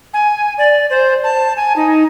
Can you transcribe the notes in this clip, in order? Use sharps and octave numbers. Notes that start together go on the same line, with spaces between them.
G#5
D5
C5
A5
G#5
D#4